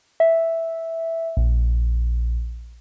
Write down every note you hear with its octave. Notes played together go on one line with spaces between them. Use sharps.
E5
A#1